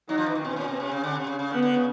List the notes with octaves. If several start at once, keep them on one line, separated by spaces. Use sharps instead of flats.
F#3 D#4
F3
E3
D#3
B2 C#4
A#2
B2
C3
C#3
D3
C3
C#3
C#3
D3 B3
D3
C#3